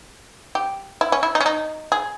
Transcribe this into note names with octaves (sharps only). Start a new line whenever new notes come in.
G4
E4
C#4
E4
D#4
C#4
D#4
G#4